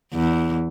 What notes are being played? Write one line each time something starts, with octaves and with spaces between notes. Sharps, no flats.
E2